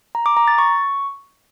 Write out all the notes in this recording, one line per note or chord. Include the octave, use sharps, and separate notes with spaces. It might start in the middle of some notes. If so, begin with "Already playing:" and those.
A#5
D6
A#5
A6
C#6